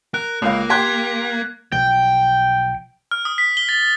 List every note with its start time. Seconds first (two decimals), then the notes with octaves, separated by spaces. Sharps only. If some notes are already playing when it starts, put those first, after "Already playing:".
0.14 A#4 F#6
0.42 C#2 A#3 F5
0.70 G4 G5 C6 F#6 G#6 B6
1.72 B1 F3 G5
3.11 F6
3.25 D#6
3.38 B6
3.57 G7
3.69 A6
3.83 A6